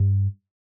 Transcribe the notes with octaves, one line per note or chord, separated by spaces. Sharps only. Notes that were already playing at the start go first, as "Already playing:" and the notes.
Already playing: G2